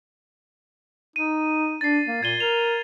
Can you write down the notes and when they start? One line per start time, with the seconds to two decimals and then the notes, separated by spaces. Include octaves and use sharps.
1.16 D#4 D#7
1.81 D4 A6 C7
2.07 A#3
2.23 A#2 G#6 D#7 G7
2.40 A#4 F7